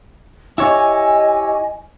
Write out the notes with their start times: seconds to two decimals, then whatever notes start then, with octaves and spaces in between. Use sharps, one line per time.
0.58 E4 G4 C#5 D#5 G#5